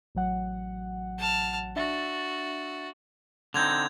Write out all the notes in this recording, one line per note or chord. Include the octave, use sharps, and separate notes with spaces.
A1 F#3 F#5
A5 F6
D4 F#4 E5 A6
D3 C4 D#4 G6 G#6 F7